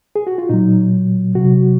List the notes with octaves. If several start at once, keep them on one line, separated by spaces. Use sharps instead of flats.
G#4
F#4
F4
A#2 F#3 D#4
C3 F#3 F#4